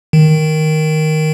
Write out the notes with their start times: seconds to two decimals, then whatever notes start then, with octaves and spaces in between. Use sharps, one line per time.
0.13 D#3